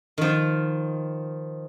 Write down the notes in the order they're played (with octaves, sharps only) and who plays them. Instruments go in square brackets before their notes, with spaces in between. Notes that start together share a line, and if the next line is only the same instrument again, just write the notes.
[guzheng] D#3 F3